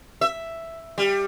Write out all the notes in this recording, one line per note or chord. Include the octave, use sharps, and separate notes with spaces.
E5
G3